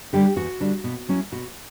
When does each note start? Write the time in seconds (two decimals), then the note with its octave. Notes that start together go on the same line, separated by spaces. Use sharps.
0.13 D3 G3 D4 G4
0.36 E2 F#4
0.60 D3 G3 D4
0.84 B2
1.09 F#3 C#4 E4
1.32 B2 F#4